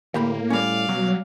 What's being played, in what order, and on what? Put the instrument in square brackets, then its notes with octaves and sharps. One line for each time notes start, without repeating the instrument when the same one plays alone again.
[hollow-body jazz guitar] D2 G4 B5 [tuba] A2 [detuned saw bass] A#3
[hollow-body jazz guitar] G3 C#4 [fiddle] D5 F5
[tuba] B2 [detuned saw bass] F#3